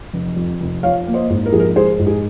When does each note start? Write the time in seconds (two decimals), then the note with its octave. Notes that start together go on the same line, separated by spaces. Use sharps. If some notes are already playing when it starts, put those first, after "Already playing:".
0.13 F1
0.36 F2
0.60 F1
0.83 F3 C#5 F5
1.07 A#3
1.14 C5 D#5
1.30 G#2
1.46 A#4
1.52 A#1 G#4
1.60 A#4
1.76 G#3 G#4 C5
1.99 G#2
2.07 G#4